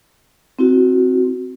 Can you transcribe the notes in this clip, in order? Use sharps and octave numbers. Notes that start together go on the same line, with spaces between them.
C4 E4 F#4